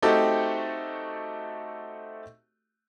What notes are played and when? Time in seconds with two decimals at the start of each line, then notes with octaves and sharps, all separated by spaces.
0.02 A3 C4 D#4 F#4 G4 A4